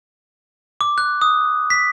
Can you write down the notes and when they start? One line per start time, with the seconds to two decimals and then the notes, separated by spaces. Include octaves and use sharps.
0.81 D6
0.98 F#6
1.22 D#6
1.70 B6